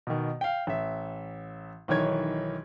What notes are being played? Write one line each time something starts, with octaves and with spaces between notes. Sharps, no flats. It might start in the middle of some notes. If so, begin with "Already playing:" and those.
B2 D#3
F5 G5
A1 E5
B1 D#3 E3 C#5 G#6